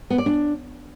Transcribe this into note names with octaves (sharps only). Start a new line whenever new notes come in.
B3
D5
D4